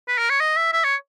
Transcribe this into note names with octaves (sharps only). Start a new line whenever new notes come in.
B4
A#4
C#5
D#5
E5
E5
C#5